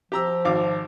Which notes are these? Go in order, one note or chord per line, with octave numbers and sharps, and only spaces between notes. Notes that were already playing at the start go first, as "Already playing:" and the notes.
F3 G4 A#5 E6
G#1 F5 D6